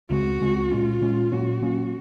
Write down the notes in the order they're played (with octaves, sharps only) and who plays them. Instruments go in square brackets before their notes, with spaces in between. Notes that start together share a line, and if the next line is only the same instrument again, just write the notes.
[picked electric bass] C#2 C#3 G#3 C4 [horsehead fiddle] F#4
[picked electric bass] C#2 C#3 G#3 C4
[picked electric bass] A#2 G#3 C#4 [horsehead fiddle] F4
[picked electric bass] A#2 G#3 C#4
[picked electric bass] A#2 F#3 A#3 C#4 [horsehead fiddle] F#4
[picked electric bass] A#2 F#3 A#3 C#4